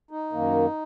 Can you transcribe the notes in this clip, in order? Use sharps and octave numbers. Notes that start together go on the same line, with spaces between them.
D#4
F#2 D#3 A#3